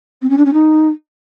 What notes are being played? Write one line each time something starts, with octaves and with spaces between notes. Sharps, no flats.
C4
C#4
D4
C#4
D#4